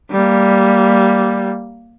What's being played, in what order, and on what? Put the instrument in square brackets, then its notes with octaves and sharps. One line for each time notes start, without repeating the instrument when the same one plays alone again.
[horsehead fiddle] G3 A#3